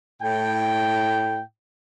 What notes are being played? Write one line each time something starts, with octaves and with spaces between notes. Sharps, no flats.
A2 G5